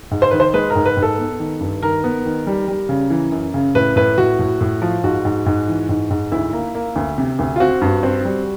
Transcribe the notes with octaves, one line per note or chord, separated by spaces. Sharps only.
G#2
C5
D#3 B4
C5
G#3 B4
A#4
G#2
B4
G#2
A4
B3
D#3
G2
D#3 A#4
B3
D#3
G3
G3
C#3
E3
F#2
C#3
A2 B4
A2 B4
A2 F#4
A2
A2
F3
G#2 F#4
G#2
G#2
E3
G#2
G#2
D2 E4
A#3
A#3
D2
C3
D2
F4
C4 F#4
G2
C4
G3